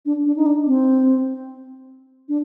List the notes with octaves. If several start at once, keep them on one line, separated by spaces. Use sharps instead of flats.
D4
D4
D#4
D4
C4
D4